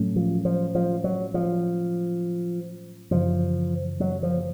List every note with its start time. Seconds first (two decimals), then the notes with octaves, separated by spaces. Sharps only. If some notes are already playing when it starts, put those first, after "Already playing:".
Already playing: A2 F#3 A3 C#4
0.16 F3
0.45 F3
0.75 F3
1.04 F#3
1.34 F3
3.11 F#2 C#3 E3 F3
4.00 F#3
4.23 F3